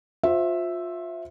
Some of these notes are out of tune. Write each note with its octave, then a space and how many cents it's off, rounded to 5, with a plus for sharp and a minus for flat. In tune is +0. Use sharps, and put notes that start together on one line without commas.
F4 +25 C5 +0 E5 +0